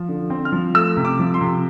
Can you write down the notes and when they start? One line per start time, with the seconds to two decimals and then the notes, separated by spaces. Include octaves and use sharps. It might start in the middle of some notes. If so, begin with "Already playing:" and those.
Already playing: F3
0.09 D3
0.30 C4
0.45 F6
0.52 F3
0.74 A3 E6
0.97 C3
1.05 D6
1.19 F3
1.34 C6
1.41 C3